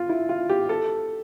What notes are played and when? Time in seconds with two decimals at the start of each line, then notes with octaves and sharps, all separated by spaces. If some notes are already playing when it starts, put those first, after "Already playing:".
Already playing: F4
0.09 E4
0.29 F4
0.49 G4
0.69 A4